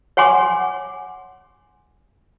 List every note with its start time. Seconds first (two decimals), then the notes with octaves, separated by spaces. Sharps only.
0.17 C#5 F#5 G#5 C6 D6